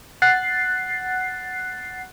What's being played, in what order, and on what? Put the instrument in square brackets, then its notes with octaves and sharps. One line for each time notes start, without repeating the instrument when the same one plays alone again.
[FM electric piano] F#5 F#6 A6 C7